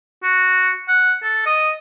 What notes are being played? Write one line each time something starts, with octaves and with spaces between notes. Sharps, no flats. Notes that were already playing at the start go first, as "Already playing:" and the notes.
F#4
F#5
A4
D#5